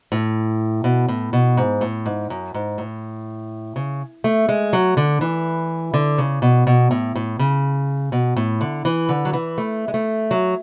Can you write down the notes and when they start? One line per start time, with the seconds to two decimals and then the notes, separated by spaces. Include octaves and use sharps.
0.12 A2
0.84 B2
1.08 A2
1.33 B2
1.57 G#2
1.81 A2
2.06 G#2
2.30 F#2
2.54 G#2
2.78 A2
3.76 C#3
4.24 A3
4.49 G#3
4.73 F#3
4.97 D3
5.21 E3
5.94 D3
6.18 C#3
6.42 B2
6.67 B2
6.91 A2
7.15 A2
7.39 C#3
8.12 B2
8.36 A2
8.61 D3
8.85 E3
9.09 D3
9.25 F#3
9.33 E3
9.58 A3
9.88 G#3
9.94 A3
10.31 F#3